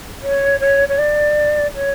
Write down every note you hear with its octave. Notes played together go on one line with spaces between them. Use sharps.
C#5
C#5
C#5
D5
C#5